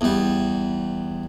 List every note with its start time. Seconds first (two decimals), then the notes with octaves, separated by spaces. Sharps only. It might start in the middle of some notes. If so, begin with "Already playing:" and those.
0.01 E2 G3